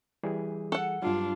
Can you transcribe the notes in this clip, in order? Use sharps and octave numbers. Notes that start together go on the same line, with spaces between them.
E3 G3 G#4
A4 F#5
G2 F#3 D4 F4